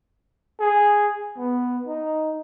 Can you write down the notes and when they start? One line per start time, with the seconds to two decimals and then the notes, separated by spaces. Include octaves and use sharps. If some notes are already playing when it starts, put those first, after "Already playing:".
0.60 G#4
1.37 B3
1.87 D#4